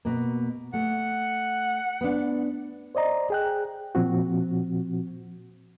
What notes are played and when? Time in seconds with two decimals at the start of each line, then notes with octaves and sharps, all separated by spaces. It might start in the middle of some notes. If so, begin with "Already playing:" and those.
0.05 B2 A#3
0.74 A3 F#5
2.01 B3 D4
2.95 C5 D5 D#5 A#5
3.30 G#4 G5 F#6
3.95 A#2 F3 C4 F#4